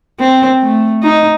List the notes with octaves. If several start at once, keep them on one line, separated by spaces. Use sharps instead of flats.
C4
A3
D#4